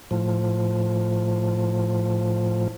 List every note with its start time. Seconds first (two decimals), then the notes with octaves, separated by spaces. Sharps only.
0.11 A2 F3